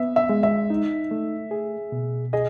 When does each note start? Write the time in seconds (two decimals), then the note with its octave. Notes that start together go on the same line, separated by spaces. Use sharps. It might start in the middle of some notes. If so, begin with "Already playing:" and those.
Already playing: B3 E5
0.16 E5
0.29 G#3
0.43 E5
0.70 D#4
1.11 A3
1.51 G#4
1.92 B2
2.33 G#4 D#5